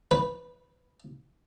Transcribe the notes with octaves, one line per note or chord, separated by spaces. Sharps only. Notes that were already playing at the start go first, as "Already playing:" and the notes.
B4